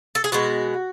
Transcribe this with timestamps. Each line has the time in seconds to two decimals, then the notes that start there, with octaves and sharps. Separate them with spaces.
0.15 A4
0.24 G#4
0.32 B2 G#3 F#4